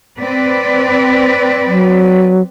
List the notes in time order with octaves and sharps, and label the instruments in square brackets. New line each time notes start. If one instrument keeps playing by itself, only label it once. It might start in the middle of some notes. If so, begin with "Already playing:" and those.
[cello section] C4 B4 D5
[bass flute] F#3